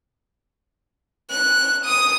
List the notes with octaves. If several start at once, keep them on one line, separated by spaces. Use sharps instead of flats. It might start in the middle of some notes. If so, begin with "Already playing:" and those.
F#6
D#6